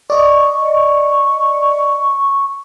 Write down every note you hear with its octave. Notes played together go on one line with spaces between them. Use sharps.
D5 D#5 C#6